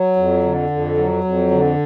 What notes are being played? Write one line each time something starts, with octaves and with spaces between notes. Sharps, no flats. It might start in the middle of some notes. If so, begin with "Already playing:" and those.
Already playing: F#3
F2
D3
F2
F#3
F2
D3